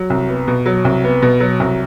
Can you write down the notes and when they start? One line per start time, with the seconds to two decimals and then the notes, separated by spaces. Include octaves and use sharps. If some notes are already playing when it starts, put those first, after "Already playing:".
Already playing: F#3
0.10 C2
0.29 B3
0.48 B2
0.66 F#3
0.85 C2
1.04 B3
1.22 B2
1.40 F#3
1.60 C2